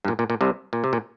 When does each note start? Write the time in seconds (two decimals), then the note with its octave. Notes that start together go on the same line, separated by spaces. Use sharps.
0.05 G2
0.08 A#2
0.19 A#2
0.30 A#2
0.41 C2 C3
0.73 A#2
0.84 C3
0.93 A#2